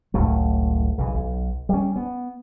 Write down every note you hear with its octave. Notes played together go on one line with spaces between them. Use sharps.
F#1 C#2 A2 A3
B1 C#3 E3
B1
G3 C#4
B3